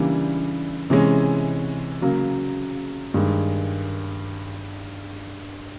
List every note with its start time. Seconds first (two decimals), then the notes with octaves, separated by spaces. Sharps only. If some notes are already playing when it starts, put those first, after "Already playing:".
Already playing: C#3 E3 G3 A#3 D4
0.90 C3 E3 G#3 C#4
2.02 C#3 F#3 A#3
3.14 G2 D#3 G#3